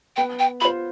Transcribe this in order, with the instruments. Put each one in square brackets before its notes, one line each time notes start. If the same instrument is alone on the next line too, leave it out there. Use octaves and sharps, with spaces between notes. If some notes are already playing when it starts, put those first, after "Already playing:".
[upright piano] B3 [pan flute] G5
[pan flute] G5
[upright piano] F4 C5 [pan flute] B5